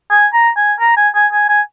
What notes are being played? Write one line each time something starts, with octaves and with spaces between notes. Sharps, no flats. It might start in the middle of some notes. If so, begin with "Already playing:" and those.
G#5
A#5
G#5
A#5
G#5
G#5
G#5
G#5